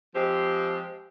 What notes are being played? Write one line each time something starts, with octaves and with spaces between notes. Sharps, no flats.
F3 G#3 C4 G4